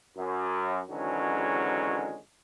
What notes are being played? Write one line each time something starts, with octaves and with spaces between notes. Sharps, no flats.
F#2
G#1 D3 E3 F#3 G#3 C#4